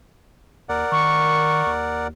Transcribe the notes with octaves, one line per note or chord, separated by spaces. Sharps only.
D#2 A#4 D5 F#5
D#3 C#6
D#2